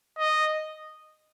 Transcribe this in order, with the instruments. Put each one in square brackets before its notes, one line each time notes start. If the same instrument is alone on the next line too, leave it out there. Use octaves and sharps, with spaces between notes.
[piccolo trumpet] D#5